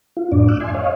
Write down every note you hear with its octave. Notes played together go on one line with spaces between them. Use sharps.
F4
F2 A2 D4 D5
D6 E6 F#6
E5 G#5 C6
C#5 D#5 F5